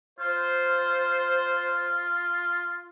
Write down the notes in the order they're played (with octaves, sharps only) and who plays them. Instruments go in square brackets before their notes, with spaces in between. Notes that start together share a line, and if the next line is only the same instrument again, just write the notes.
[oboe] F4 [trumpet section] C5